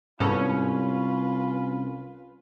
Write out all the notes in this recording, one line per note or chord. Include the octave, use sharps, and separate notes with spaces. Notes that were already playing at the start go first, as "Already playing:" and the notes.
C2 G#2 B3 C#4 F4 A4 B4